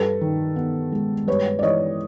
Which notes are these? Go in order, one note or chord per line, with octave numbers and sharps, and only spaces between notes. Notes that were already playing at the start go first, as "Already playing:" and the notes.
Already playing: G2 A4 B4
D#3
B3
G#3
G2 B4 C#5
D5
E3 C#5 D#5